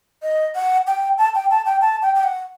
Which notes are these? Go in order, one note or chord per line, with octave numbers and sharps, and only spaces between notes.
D#5
F#5
G5
A5
G5
A5
G5
A5
G5
G5
F#5